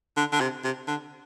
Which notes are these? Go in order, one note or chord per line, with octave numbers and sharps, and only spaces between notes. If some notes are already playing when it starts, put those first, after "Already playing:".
D3
D3
C3
C3
D3